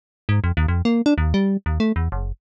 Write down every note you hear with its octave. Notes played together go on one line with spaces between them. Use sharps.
G#2
F2
D#2
F2
A#3
D4
D#2
G3
D#2
A3
E2
F#1